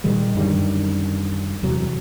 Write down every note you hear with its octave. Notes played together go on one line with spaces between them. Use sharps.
A#2 D#3 G3 G#3
F#2 D3 D#3 G3
E2 C3 F#3